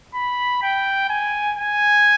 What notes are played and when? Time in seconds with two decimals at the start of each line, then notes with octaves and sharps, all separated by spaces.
0.15 B5
0.62 G5
1.10 G#5
1.58 G#5